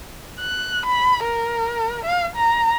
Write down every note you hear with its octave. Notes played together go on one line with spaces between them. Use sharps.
F#6
B5
A#4
F5
A#5